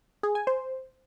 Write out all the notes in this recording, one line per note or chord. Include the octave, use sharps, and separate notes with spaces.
G#4
G#5
C5